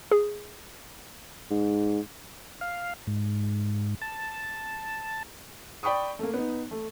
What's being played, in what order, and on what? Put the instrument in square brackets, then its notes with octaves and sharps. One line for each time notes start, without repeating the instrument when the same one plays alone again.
[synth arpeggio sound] G#4
[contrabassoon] G#2
[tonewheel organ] F5
G#2
A5
[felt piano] D5 G5 B5 C#6 D#6
A3 A#3
B3 D#4
A3